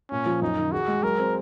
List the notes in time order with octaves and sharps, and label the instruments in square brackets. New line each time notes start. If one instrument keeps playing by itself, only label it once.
[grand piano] A#2 [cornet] C#4
[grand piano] F3
[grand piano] F#2 [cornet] D#4
[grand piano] D#3
[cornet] F#4 [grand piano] G#4
[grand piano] G#3
[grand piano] F#3 [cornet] A#4
[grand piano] C4